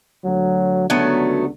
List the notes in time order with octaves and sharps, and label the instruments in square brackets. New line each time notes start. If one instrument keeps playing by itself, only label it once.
[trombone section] D2 F#3
[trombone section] C#2 D3 D4 [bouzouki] F#3 A3 B3